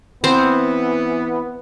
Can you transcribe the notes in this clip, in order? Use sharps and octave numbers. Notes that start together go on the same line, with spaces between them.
E3 B3 C4 C5